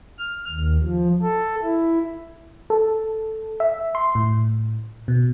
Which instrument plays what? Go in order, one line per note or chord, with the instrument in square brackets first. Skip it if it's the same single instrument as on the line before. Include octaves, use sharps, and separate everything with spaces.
[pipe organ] F6
D#2
F3
A4
E4
[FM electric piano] A4
E5
C6
A2
B2